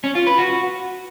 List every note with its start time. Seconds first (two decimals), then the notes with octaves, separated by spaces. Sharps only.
0.04 C#4
0.15 F4
0.27 B4
0.38 F#4